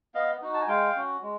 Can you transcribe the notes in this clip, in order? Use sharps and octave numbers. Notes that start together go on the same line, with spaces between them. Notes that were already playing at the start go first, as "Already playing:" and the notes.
B3 D#5 F5
D#4 F#4
A5
G#5
G#3 F5 G5
C#4 F#4
G#3